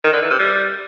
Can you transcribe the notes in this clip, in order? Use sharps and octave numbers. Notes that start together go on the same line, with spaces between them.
D#3
D3
E3
C3
G3